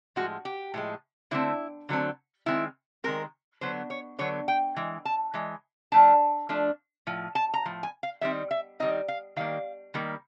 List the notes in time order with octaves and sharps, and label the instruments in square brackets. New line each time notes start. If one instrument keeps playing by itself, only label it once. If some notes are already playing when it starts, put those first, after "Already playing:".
[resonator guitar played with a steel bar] A2 F3 G#3 F#4
G4
A2 F3 G#3
D3 F#3 A3 C4 E4
D3 F#3 A3 C4
D#3 G#3 C4 E4
D#3 G#3 C4 A#4
D3 F#3 B3 C5
C#5
D3 F#3 B3 C#5
G5
E3 G#3
A5
E3 G#3
F3 A3 D4 A5
F3 A3 D4
A2 F3
A5
A#5
A2 F3
G#5
F5
D#3 G3 C4 D#4 E5
E5
D#3 G3 C4 D#4 D#5
F5
D#3 G3 A#3 F5
D#3 G3 A#3